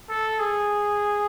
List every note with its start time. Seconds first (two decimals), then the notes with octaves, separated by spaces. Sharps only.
0.09 A4
0.39 G#4